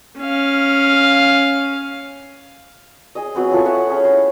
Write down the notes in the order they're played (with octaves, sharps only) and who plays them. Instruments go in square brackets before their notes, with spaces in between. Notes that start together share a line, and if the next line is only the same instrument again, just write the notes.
[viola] C#4 F5
[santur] G#4 D#5
F#3 B3 C4
E4 F4 A4 C#6
C#5 E5 F#5
C#4 G#4 G5
E4 C6